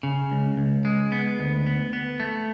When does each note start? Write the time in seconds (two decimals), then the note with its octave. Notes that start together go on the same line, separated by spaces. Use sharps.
0.03 C#3
0.32 C#2
0.57 C#2
0.85 G#3
1.12 B3
1.39 D2
1.66 B3
1.93 B3
2.20 A3